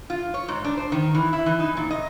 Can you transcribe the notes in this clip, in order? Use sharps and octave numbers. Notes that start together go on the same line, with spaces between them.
F4
C#5
G#2
D4
C5
D#3
E3
E4
E3
D#4
A#2
D#5